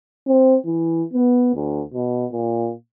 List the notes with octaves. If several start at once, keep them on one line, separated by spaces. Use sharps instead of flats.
C4
E3
B3
D2
B2
A#2